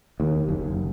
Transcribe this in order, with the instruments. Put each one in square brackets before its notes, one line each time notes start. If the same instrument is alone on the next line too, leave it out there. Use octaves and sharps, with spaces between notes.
[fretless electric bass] D#2
F#1